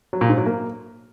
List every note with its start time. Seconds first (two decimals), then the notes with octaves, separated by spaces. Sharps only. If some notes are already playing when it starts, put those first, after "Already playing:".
0.13 F#3
0.21 A#2
0.29 G#2
0.38 F#3
0.46 A#3